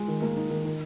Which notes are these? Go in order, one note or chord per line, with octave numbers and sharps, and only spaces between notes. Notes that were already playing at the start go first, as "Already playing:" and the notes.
Already playing: G#3
D#3
A#3
D#4
D#3
D#3